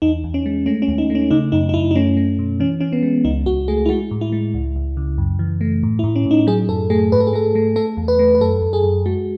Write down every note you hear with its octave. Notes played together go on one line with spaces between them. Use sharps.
E2 D#4
E2
C#4
G#3
A3 C#4
C#4
D#2
D#4
A3
C#4
C#3 D#4
F#2 D#4
D#4
F#2 E4
D#4
A3 C#4
A3
B2
E3 C#4
E3 C#4
B3
G#3
C#2 D#4
C#2 F#4
A3 G#4
E4
G#3 F#4
A2
E4
G#3
C#2
C#2
C#3
F#2
E3
A3
A2
E4
A2
C#4
A2 D#4
F#3 G#4
F#2 A4
A3 G#4
G#2 B4
A4
G#4
A3 A4
A3
A3 A4
E2
B4
A3
B4
F#2 A4
F#2
G#4
F#2
G#3 F#4